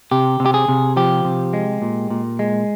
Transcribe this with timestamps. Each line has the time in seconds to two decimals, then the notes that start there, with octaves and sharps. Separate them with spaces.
0.11 C3 G4
0.40 C3
0.46 G4
0.54 G#4
0.68 C3
0.97 F3 G4
1.25 C3
1.53 G#3
1.82 A#2
2.10 A#2
2.39 G#3